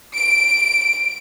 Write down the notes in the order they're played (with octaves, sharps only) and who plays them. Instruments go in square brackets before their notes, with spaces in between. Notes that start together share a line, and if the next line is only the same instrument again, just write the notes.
[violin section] D7